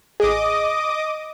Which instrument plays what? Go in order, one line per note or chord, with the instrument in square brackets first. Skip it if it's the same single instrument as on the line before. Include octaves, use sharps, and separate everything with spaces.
[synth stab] A1 G#4 [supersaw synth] D#5 D6 D#6